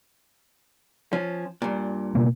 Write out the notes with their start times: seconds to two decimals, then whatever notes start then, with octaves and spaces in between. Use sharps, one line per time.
1.13 F3 C#4
1.62 G2 A#2
2.15 B2 A#3